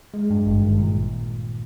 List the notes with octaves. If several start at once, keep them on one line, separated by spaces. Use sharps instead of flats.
G#3
G2
G#1
D#3
A#2